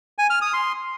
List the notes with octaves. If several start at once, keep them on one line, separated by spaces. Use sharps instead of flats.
G#5
F6
D#6
C6